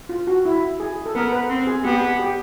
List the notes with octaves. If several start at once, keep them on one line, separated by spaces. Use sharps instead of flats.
F4
F#4
E4
G#4
A4
B3 A#4
B4
C4
G#4
B3 G4
G#4
G4